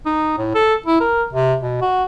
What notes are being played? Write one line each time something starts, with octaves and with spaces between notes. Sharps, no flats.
D#4
A2
A4
E4
A#4
C3
B2
F#4